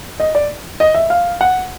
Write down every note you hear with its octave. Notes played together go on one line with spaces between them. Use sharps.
D#5
D5
D#5
E5
F5
F#5